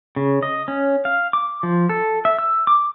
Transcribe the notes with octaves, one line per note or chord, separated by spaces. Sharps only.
C#3
D#5
C#4
F5
D6
F3
A4
E5
E6
D6